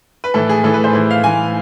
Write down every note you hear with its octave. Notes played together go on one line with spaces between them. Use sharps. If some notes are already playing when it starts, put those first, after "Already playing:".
B4
A2 E3 A4
G#4
A2 E3 A4
B4
C5
A2 E3
F5
A2 E3 G#5